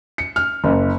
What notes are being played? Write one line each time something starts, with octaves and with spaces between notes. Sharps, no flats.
C#7
F6
F#1